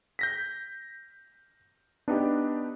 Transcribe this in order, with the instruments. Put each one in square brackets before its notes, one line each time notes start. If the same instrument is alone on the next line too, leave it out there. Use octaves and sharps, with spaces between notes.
[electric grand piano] G6 A#6 B6
[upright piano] B3 D#4 G4 [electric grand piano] D4